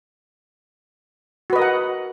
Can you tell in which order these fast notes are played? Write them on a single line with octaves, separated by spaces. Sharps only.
F#4 B4 D#5 A#4 F#5